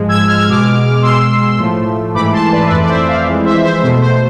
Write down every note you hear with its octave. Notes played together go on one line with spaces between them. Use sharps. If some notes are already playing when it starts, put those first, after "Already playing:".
Already playing: G#2 F3 G#3
E6 G#6
F6
G#6
B2 G#3 D6 F6
B2 G#3 C6 E6
A2 F3 A3
G#2 E3 A3 B5 D6
A5 C6
B4 D5
E5
F2 E3 A3 B4 D5
D5
C5 E5
D5 F5
F2 E3 G#3
C5 E5
C5 E5
B2 A3 C5
C5